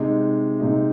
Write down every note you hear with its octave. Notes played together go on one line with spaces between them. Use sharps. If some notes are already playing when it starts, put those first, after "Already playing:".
Already playing: C3 G#3 D#4
C3 G#3 D#4